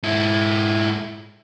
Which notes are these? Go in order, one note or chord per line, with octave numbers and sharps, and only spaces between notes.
G#2 E4